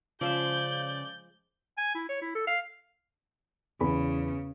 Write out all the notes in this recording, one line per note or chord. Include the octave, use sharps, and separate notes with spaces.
C#3 F3 G#3 D5 E5 G6
G#5
E4
C#5
E4
A4
F5
E2 C#3 B5